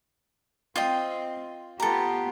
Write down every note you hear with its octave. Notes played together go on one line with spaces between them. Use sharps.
C4 F4 D#5 G5
B3 F4 G4 A4 A#5